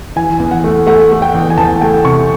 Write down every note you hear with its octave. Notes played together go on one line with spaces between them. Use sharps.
E3 G#5
E2
F#5
A3
A3 F#5
A3
G5
E2
G#5
E2 A5
A3 G5
C3 C#6